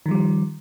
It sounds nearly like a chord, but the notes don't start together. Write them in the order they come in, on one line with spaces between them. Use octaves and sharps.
D#3 F3 G3